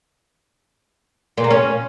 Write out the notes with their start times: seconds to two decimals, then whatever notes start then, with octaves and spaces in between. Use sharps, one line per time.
1.37 A#2
1.44 A#3
1.50 C#4